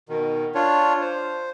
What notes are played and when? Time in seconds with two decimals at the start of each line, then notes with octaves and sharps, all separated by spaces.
0.09 B2 D#3
0.55 D4 F4 C#5
1.01 C5